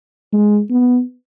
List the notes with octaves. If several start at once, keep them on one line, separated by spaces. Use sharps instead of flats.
G#3
B3